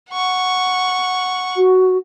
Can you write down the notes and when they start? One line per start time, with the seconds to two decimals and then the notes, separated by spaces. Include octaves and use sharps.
0.10 F#5 C#6
1.57 F#4